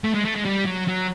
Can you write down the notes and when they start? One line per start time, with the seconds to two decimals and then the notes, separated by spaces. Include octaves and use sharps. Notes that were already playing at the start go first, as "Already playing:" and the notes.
0.04 A3
0.14 G#3
0.25 A3
0.36 G#3
0.45 G3
0.66 F#3
0.88 F#3